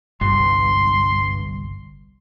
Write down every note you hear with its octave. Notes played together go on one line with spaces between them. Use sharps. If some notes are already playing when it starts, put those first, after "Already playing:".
G1 C2 G2 C6